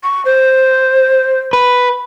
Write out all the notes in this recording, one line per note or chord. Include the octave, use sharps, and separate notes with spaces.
C#6
C5
B4